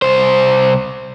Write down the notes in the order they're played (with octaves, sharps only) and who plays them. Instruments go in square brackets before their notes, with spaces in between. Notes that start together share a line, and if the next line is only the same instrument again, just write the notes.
[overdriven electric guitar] C2 C5